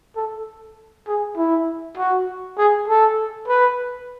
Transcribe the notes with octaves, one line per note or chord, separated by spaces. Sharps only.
A4
G#4
E4
F#4
G#4
A4
B4